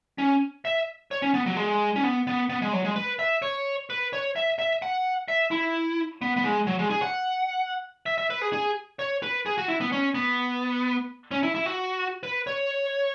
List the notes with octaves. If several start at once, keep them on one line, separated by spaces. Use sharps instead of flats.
C#4
E5
C#5
C#4
B3
F#3
G#3
C#4
B3
B3
B3
G#3
F#3
G#3
B4
E5
C#5
B4
C#5
E5
E5
F#5
E5
E4
B3
B3
G#3
F#3
G#3
G#4
F#5
E5
E5
B4
G#4
G#4
C#5
B4
G#4
F#4
E4
B3
C#4
B3
C#4
E4
E4
F#4
B4
C#5